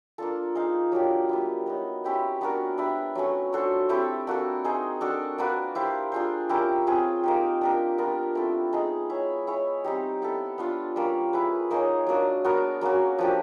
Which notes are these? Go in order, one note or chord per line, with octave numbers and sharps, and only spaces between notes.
A#3 D4 F4 A4
D#4 G#4 C5 F5
F#3 A#3 D4 G4
G3 B3 E4
F#3 B3 D#4
C#4 E4 G4 C5
B3 D4 F#4 A#4
D4 G4 B4 E5
F#3 A3 C#4
D4 F#4 A4 C5
A3 C4 E4 G4
A#3 D4 F#4 A4
D#4 G#4 C5
D4 F#4 A4 D5
A#3 D4 F#4 B4
E4 G4 C5 F5
D4 F4 G#4 C5
C#4 E4 G4 A#4
C4 F4 G#4
A#3 D#4 G4
D4 G4 A#4
B3 D4 F4 A#4
A3 C4 E4 A4
G#3 B3 D#4 G#4
E4 G#4 C#5 E5
E4 G#4 C#5
G3 C4 D#4 G4
B3 E4 A4
B3 D4 F4
G3 A#3 C#4
E4 G#4 B4
A#3 D#4 G#4 C#5
F#3 A#3 D4
B3 D4 F#4 A#4
F#3 A#3 C#4 F#4
F3 A#3 D4 G4